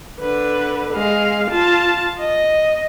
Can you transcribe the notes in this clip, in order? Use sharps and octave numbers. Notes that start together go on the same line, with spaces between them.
D3 B4
G#3 F5
F4 A5
D#5